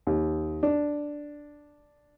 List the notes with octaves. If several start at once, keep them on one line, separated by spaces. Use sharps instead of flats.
D#2
D4